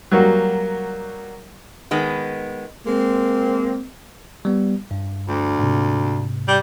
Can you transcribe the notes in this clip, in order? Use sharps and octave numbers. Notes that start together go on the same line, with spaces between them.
F#3 G3 A#3 F#4
D#3 G#3 B3
G#3 A#3 C4
G3 B3
G2
D2
G#2 C3
G3